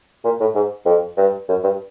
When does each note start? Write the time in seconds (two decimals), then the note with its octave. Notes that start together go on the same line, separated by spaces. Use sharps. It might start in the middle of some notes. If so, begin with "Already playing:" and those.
0.25 A#2
0.40 A2
0.55 G#2
0.86 F2
1.17 G2
1.49 F#2
1.64 G2